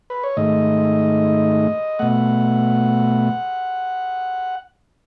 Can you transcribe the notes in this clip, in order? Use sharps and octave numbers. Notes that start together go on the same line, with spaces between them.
B4
C#5
G#2 D#3 A3 D#5
B2 A3 F#5